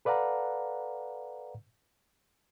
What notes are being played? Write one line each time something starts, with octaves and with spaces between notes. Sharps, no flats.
A4 B4 D5 F5 F#5 A#5